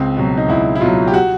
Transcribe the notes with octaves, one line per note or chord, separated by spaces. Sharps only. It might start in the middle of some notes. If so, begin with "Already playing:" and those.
Already playing: C#2 C4
B2 F#3
D#4
C#2 E4
E4
B2 F#3 F4
G4
F#4